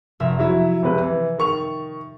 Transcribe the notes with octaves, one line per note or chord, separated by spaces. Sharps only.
F1 E5 A#5
F#3 E4 E5
C#2 C3 B4
E3
D#3 C#6 F7